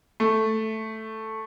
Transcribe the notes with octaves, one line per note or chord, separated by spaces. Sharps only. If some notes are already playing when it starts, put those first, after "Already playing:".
A3